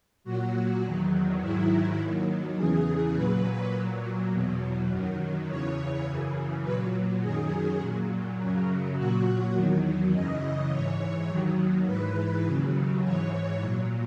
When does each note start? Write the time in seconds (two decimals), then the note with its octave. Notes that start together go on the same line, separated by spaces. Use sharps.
0.24 A#2 F#3 F#4
0.83 E2 D#3 F#3
1.41 G#2 D#3 F#3 E4
1.99 D#2 D#3 F#3
2.57 E2 C#3 E3 G#4
3.15 A#2 F#3 B4
3.73 A#2 F#3
4.31 E2 B2 F#3
4.89 F#2 D#3 F#3
5.48 E2 C#3 E3 C#5
6.05 F#2 C#3 E3
6.64 A#2 F#3 B4
7.21 F#2 D#3 F#3 G#4
7.80 A#2 F#3
8.38 F#2 C#3 F#3
8.96 A#2 F#3 F#4
9.54 E2 D#3 F#3
10.12 F#2 C#3 E3 D#5
10.70 G#2 E3 C#5
11.29 D#2 D#3 F#3
11.86 G#2 E3 B4
12.44 D#2 C#3 F#3
13.03 G#2 E3 C#5
13.61 A#2 F#3